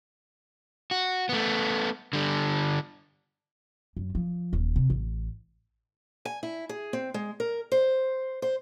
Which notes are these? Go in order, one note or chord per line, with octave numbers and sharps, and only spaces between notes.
F#4
A3 B3
D3 G3
F#2
F3
D#1
C3
A1
G#5
E4
G#4
C4
G#3
A#4
C5
C5